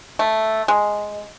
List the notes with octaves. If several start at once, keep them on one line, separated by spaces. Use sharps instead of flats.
A3
G#3